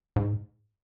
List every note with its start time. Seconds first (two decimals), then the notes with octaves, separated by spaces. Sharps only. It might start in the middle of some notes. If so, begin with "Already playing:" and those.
0.16 G#2